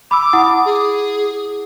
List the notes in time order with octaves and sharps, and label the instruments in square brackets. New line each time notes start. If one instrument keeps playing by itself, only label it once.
[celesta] B5 E6 [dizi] D6
[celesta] E4 F#5 D#6
[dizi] G#4